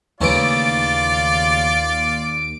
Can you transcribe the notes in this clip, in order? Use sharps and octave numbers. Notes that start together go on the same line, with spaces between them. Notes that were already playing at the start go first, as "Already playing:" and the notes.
D#2 C#3 E3 A3 F4 D5 D7